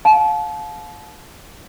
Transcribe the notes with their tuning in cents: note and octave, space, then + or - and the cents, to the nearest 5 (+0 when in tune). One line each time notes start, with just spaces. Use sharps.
F5 +30 A5 -30